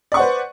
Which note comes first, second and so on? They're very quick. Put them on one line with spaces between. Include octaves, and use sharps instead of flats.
D5 C#6 F#5 C5 B4